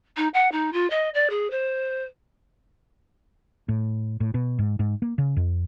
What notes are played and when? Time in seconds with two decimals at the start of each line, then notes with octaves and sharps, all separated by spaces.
0.17 D#4
0.34 F#5
0.52 D#4
0.73 F4
0.90 D#5
1.14 D5
1.30 G#4
1.51 C5
3.68 A2
4.20 A2
4.34 B2
4.59 G#2
4.79 G#2
5.02 A#3
5.18 C#3
5.36 F2